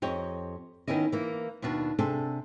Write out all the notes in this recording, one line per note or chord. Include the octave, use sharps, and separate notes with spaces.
F2 G4 C#5 D#5
D#3 B3 C#4 E4 D#5
E3 A#3
D#2 B2 D4 F4 F#4
C3 D4 G#4 A4